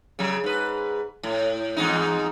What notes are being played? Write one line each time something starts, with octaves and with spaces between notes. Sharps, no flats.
C#3 F#3
G#2 B4
A2
E2 G#2 D#4